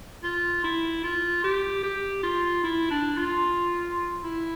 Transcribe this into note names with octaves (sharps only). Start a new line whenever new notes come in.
F4
E4
F4
G4
G4
F4
E4
D4
F4
E4